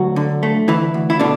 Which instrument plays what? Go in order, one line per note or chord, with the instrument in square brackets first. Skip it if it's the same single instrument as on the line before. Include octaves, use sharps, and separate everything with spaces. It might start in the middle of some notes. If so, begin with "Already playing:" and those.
Already playing: [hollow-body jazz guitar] D2 F#3 F#4
D3
A3
D2 E3 E4
D2
E4
B2 D3 D4